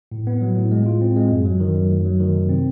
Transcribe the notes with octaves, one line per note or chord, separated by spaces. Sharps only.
A2
B3
F#3
A2
G#3
F4
C4
G#3
F#2
F#3
D#3
F#2
A3
F#3
D#3
C3
C4